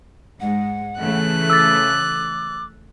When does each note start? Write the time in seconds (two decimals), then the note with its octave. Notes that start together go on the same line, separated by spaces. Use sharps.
0.40 G#2 G#3 F#5
0.99 C#3 E3 A3 F#6
1.50 D6 E6 A6